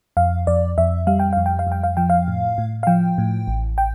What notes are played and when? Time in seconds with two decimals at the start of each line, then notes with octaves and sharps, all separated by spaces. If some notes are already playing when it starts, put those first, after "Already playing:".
0.17 F2 F5
0.47 F2 D5
0.78 F2 E5
1.07 G3 F5
1.19 G5
1.33 F2 F5
1.46 G5
1.59 F5
1.67 F2 G5
1.83 F5
1.97 F3 G5
2.10 F5
2.28 A2
2.58 A2
2.83 F5
2.87 F3 G5
3.18 A2
3.48 A1
3.78 G5